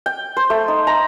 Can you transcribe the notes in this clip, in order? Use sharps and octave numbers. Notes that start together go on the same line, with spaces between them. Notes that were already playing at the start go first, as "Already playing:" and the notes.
G5
C5
A3
D#4
A#5